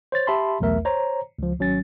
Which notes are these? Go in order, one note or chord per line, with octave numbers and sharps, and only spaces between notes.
C5 C#5 A6
G4 E5 A5 B5 C6
B1 E2 A3 A#4 E5
C5 C#5 A#5
C#2 F3
G#1 F#3 C#4 A6